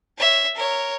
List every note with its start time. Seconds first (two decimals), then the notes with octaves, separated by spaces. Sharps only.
0.17 C#5 E5
0.55 A#4 C#5